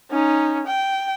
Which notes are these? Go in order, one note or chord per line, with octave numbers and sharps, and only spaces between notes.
C#4 D#4
G5